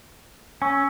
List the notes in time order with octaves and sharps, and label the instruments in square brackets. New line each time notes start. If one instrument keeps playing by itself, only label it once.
[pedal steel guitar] C#4 [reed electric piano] G#5 C#6 [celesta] E6